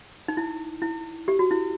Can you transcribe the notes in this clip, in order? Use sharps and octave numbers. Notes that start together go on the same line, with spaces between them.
D#4
E4
E4
G4
F#4
E4